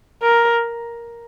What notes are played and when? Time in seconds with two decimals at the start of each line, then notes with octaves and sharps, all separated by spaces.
0.23 A#4